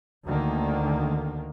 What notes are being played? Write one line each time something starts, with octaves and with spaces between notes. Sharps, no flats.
D2 D3 D#3 A#3